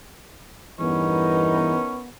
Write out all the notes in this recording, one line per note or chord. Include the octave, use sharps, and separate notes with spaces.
E2 G2 E3 B3 C#4 D#4 A#4 B4